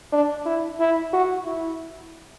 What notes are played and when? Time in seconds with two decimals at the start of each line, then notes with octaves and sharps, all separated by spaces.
0.12 D4
0.46 E4
0.80 E4
1.13 F#4
1.46 E4